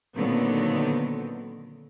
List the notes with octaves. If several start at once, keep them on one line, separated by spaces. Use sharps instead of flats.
A#2 D3 D#3 F#3 B3 C4